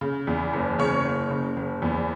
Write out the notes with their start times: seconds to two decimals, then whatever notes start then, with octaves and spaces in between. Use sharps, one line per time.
0.01 C#3
0.27 E2
0.53 F#1
0.79 C#3 C#5
1.05 F#1
1.31 C#3
1.57 F#1
1.82 E2